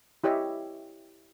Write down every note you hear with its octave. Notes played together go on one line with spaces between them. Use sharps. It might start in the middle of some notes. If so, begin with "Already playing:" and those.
E4 G4 C#5 D#5 E5